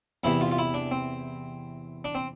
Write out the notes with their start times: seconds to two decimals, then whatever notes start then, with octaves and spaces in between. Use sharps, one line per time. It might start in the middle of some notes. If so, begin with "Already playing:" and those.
0.24 E2 C3 E3 E4
0.41 F4
0.51 F4
0.58 E4
0.74 D4
0.91 C4
2.05 D4
2.15 C4